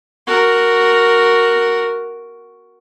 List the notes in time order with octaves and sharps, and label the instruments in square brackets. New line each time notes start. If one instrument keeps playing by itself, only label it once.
[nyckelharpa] F#4 A#4